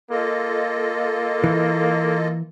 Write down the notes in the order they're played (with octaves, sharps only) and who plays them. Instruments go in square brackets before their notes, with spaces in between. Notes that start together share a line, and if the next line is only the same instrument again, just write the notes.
[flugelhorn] A#3 [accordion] F4 A4 D#5
[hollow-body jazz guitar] E3